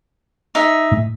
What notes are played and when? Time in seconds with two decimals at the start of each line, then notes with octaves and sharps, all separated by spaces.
0.55 D#4 G#4 E5
0.92 A2